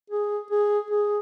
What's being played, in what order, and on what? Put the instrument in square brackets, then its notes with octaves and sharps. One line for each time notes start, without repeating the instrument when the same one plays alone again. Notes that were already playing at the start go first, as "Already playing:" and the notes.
[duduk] G#4
G#4
G#4